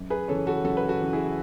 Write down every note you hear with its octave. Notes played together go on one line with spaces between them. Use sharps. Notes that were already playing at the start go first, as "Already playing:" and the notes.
Already playing: F#2
G#4 B4
C#3 E3 A4 C#5
F#4 A4
F#2 F#4 A4
B4
F#4 A4
C#3 E3
E4 G#4